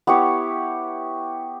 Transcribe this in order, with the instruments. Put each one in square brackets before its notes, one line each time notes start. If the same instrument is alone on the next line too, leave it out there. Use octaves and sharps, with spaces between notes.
[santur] B3 E4 G4 C#5